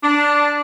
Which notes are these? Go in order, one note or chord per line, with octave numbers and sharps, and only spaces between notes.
D4